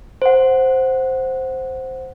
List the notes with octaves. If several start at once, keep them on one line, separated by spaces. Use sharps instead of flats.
C5 F#5